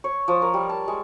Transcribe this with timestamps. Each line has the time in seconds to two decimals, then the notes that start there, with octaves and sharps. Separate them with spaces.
0.04 C#5
0.28 F3
0.42 A#4
0.54 G3
0.69 A5
0.88 G#3